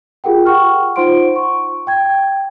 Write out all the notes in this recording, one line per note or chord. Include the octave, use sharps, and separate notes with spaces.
F4 G4 G#4 A#4 F#5 G5
F#5 G5 C#6 F6
D#4 F4 C5 F#5 C6 D7
C#6
G5 G#6